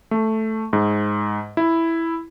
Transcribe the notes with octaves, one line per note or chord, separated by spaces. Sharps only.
A3
G#2
E4